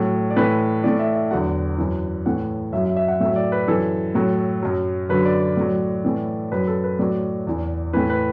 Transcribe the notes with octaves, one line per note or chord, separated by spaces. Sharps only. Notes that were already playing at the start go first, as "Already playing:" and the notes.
Already playing: A2 F#3
D5
A2 E3 B4
A2 E3 D5
E5
E5
E2 D3 F#3 F#5
F#2 E3
A2 E3 F#5
F#2 F#3 E5
E5
E5
F#5
A2 F#3 E5
D5
B4
F#2 E3 A4
A2 F#3
F#2 F#3
F#2 D3 F#3 B4
D5
D5
A2 F#3
A2 E3
F#2 F#3 B4
A4
B4
A2 F#3 D5
E2 E3
A2 E3 B4
B4